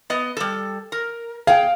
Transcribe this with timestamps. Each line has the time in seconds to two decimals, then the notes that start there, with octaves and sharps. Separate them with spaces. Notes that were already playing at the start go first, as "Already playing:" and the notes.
0.10 B3 D#5
0.37 G3 A4
0.92 A#4
1.47 G#4 F5 G5